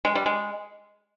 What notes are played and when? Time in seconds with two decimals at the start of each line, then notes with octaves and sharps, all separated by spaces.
0.05 G#3
0.15 G3
0.26 G#3